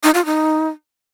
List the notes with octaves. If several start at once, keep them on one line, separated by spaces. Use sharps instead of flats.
D#4
F4
D#4